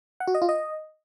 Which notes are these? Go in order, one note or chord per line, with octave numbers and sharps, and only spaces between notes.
F#5
F#4
D#5
F4
D#5